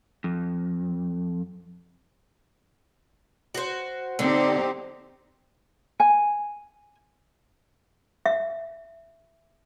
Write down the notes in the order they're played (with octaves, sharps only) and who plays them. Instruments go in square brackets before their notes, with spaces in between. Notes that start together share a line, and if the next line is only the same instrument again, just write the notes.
[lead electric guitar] F2
[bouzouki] F#4 C5
[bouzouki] D3 [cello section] C4 D#4 G4
[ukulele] G#5
[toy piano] E5